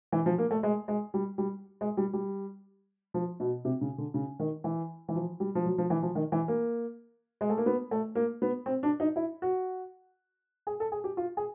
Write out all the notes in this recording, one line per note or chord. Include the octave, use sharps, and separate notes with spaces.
E3
F3
A#3
A3
G#3
G#3
G3
G3
G#3
G3
G3
F3
B2
C3
C#3
D3
C#3
D#3
E3
E3
F3
G3
F3
F#3
F3
E3
F3
D#3
E3
A#3
G#3
A3
A#3
B3
A3
A#3
B3
C4
D4
D#4
E4
F#4
G#4
A4
G#4
G4
F4
G#4